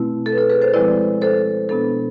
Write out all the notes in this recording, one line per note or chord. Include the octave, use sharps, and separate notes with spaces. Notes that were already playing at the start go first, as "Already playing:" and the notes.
Already playing: B2 A3 C4 E4
A4
B4
A4
G#4 B4
A4 C5
F3 G#3 C4 E4 B4 D5
A4 C5
B2 B3 D4 A4